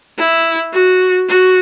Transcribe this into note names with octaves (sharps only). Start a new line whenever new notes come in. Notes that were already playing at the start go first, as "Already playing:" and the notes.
E4
F#4
F#4